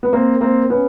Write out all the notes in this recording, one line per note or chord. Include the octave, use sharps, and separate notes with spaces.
B3
A#3 C4
A#3 C4
B3 C#4